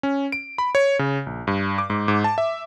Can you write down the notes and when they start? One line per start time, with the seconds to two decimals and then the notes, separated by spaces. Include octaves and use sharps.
0.03 C#4
0.32 D7
0.58 B5
0.75 C#5
0.99 C#3
1.26 A#1
1.47 G2
1.78 D6
1.90 G#2
2.08 G#2
2.24 A5
2.38 E5